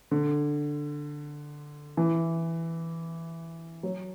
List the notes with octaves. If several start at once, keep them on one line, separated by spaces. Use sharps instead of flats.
D3
E3
F#3